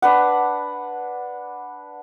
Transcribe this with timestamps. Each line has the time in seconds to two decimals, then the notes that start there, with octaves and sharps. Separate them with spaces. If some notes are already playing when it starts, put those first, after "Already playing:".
0.02 D4 B4 F#5